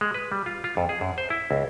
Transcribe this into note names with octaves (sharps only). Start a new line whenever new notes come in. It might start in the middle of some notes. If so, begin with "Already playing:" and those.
G#3
B4
G3
F4
F4
F2
G#4
F#2
C5
E4
C#2